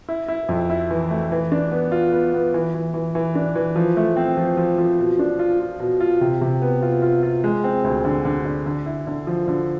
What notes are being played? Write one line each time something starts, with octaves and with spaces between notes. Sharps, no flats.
E4
E4
F2
E4
E3
A3
E3
D4
B3
F4
B3
B3
E3
E3
E3
E3
D4
E3
F3
A3
C4
F3
F3
F3
B2
D4
F4
F4
B2
F4
C3
C3
B3
F4
F4
F4
G#3
C4
D2
D3
D3
D3
D3
E4
D3
F3
D3